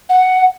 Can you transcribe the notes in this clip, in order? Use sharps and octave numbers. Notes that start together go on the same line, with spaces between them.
F#5